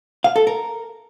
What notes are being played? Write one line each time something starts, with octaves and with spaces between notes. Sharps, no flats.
F5
A4
A#4